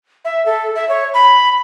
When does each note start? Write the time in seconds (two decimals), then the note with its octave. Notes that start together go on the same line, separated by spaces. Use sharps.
0.25 E5
0.46 A4
0.75 E5
0.89 C#5
1.14 B5